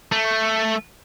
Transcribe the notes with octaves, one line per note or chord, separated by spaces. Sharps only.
A3